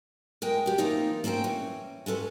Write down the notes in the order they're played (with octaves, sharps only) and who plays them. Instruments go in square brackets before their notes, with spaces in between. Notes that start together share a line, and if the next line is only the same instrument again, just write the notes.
[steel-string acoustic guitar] E2 G#3 A#4 D#5 G5
B3 G4
E3 A3 A#3 C4 D#4 F4
A#3 C4 C#4 E5 G5
E3 C#4
G#3 C#4 A4 B4